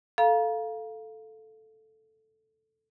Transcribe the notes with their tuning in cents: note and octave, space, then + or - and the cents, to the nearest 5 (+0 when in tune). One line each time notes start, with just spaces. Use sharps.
A4 +0 F5 +0 A#5 +30